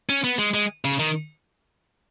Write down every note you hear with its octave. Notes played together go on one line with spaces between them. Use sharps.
C#4
B3
G#3
G#3
C#3
D#3